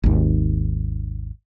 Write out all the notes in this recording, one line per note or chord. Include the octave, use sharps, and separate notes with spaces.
G#1 D#2